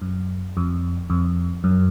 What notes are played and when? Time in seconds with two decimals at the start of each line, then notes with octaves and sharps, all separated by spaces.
0.02 F#2
0.57 F2
1.10 F2
1.64 F#2